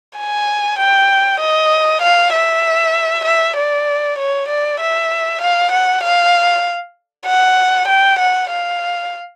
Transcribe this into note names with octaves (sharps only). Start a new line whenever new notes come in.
G#5
G5
D#5
F5
E5
E5
D5
C#5
D5
E5
F5
F#5
F5
F#5
G5
F#5
F5